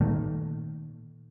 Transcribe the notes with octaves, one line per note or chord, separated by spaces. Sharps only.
A#2 D#3 A3